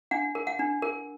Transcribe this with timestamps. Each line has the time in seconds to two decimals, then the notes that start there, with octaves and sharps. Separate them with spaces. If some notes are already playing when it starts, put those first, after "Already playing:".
0.11 D4 F#5
0.35 A#4
0.47 F#5
0.59 D4
0.82 A#4